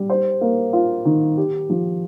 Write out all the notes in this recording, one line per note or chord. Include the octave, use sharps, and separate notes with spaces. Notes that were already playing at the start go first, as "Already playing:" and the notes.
Already playing: G3
C5
A#3
F4
D#3
G4
F3